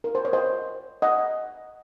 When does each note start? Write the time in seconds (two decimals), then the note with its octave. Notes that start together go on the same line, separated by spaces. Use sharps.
0.04 A#4
0.15 C5
0.25 C#5
0.33 C5 D#5
1.02 D#5 F#5